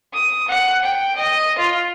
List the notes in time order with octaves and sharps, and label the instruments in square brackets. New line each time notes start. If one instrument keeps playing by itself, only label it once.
[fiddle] D#6
F#5
G5
D#5
F4